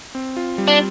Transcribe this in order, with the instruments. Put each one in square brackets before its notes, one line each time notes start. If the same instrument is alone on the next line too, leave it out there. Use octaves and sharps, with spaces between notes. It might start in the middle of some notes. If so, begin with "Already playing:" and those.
[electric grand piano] C4
F4
G3
[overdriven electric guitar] D4